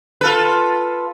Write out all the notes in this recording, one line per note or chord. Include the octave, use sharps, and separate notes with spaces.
F4 A4 B4